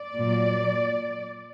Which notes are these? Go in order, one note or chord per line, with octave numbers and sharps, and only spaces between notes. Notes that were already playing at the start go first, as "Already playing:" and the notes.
Already playing: D5
A#2 F#3